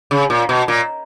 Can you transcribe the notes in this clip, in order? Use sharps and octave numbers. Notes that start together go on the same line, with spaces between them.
C#3
A#2
B2
A#2